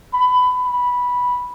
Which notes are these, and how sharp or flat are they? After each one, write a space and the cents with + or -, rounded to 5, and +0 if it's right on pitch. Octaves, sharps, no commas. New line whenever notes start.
B5 +20
B5 -10